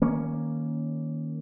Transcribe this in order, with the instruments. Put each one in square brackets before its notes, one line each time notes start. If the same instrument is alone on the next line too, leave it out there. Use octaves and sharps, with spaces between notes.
[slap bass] D#3 A#3 C#4